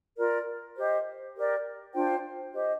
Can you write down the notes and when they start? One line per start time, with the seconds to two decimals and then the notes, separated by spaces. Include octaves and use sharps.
0.17 F4 A#4 D5
0.76 G4 C5 D#5
1.35 G4 A#4 D5
1.94 D4 F4 C5 G5
2.52 G4 C5 D#5